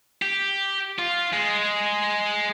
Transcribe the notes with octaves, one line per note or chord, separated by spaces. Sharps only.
G4
F4
G#3